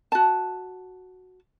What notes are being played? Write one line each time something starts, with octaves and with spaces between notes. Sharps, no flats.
F#4 A5